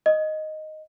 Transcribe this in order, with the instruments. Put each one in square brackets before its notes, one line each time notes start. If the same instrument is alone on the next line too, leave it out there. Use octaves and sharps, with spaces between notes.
[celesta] D#5